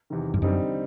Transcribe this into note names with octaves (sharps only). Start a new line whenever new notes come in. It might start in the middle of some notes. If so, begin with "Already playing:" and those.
E2 C3 D#3
G2
F#2 D3 G3 C4 D#4